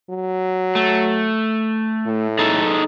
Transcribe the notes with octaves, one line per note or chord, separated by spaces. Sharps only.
F#3
A3
A2
D#4 G#4 A4